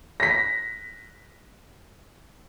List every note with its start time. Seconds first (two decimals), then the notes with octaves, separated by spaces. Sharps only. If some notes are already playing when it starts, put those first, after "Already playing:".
0.20 A#6 B6